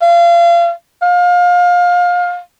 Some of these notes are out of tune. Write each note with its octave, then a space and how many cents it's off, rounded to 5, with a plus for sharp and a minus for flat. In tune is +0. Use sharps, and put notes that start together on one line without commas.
F5 -30
F5 +25